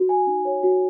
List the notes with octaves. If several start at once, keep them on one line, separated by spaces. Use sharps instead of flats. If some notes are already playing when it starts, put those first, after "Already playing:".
Already playing: F#4
G#5
D#4
C#5
F#4